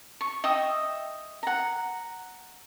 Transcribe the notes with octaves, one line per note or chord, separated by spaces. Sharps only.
C#6
D#5 E5 G5 D#6
F#5 A#5